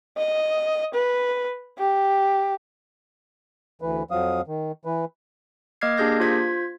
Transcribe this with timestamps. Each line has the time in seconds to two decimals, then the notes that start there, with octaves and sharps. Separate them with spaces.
0.17 D#5
0.94 B4
1.79 G4
3.82 D2 E3 B4
4.11 F2 F3 F#3 F5 D#6
4.47 D#3
4.85 E3 B4
5.81 A#3 D#5 D6 F6 G#6 C7
5.97 A#3 D4 G4 G#4 G6 A#6
6.20 F4 C5 G#6 B6